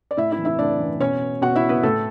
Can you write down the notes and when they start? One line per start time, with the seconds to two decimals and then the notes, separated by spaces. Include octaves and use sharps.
0.11 D5
0.17 A2 E4 E5
0.32 E4 E5
0.39 E3
0.45 E4 E5
0.59 A2 D4 D5
0.79 E3
1.00 B2 C#4 C#5
1.42 B2 F#4 F#5
1.56 E4 E5
1.69 B3 B4
1.83 A2 A3 A4